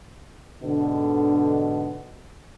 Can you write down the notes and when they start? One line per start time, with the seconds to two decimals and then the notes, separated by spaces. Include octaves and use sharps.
0.62 G#2 B2 D3